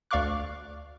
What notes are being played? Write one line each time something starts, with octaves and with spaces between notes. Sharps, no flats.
D2 D5 F5 C#6 D6 F#6